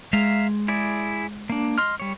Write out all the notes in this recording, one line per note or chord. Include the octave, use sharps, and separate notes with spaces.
G#3 E5 F5 A#5
E4 G#4 D5
A#3 D4
D#5 C6 F6
G3 C#5